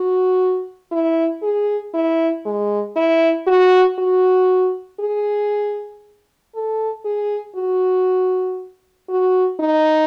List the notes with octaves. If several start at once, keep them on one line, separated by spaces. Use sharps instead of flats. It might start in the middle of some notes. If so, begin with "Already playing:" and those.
Already playing: F#4
E4
G#4
E4
G#3
E4
F#4
F#4
G#4
A4
G#4
F#4
F#4
D#4